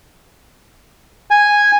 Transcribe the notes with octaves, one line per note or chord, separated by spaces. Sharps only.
G#5